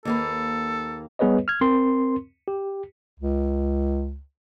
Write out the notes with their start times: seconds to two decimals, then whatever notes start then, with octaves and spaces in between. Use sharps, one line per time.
0.05 D#2 A#3 A4 B4
1.19 G3 B3 G#4 B4 C#5 D#5
1.48 F6 G#6
1.61 C4 A#4 C6
2.48 G4
3.19 C#2